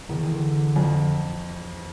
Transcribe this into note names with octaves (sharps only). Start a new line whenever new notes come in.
E2 D#3
D#3
D3
F2